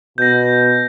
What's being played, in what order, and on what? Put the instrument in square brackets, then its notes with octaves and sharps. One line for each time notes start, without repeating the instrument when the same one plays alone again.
[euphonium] B2 [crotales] G6 A#6